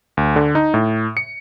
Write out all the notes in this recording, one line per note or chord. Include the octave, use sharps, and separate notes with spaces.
D2
D3
D#4
A2
C#7